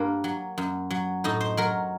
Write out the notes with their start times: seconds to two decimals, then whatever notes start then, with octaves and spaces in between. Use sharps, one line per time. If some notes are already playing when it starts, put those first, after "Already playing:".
Already playing: G2 A#3
0.24 F#3
0.58 F#2
0.91 F#3
1.24 A2 D#4
1.41 C5
1.57 F#3 A#4